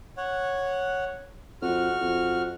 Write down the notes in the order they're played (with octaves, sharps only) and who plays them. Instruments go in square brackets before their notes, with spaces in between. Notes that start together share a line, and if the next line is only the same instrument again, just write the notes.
[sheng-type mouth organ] C#5 F#5
[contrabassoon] F2 [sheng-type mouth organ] F#4 F6
[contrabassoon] F2